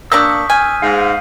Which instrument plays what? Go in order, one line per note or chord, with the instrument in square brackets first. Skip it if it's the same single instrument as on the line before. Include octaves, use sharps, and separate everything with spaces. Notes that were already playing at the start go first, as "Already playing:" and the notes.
[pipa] A#3 D4 [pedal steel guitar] C#6 E6 [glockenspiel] D#6 G6 B6
[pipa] G#5 [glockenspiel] F6 G6 D#7
[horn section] G#2 [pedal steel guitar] F5